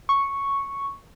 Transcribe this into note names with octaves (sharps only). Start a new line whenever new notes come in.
C#6